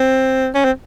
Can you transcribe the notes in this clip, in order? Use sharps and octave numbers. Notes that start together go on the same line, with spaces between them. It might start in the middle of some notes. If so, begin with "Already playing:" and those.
Already playing: C4
C#4
C4